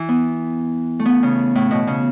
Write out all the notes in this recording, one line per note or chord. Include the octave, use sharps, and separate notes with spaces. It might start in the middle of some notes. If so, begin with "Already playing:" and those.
Already playing: E3
B3
A3
B3
C#3
A2
B2
C#3